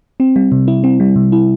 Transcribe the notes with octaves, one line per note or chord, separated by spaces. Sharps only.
C4
G3
C3
E4
C4
G3
C3
E4